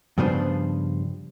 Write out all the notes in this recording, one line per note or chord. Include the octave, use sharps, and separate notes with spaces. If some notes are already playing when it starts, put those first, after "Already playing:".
G2 C#3 F3 B3 D4 C5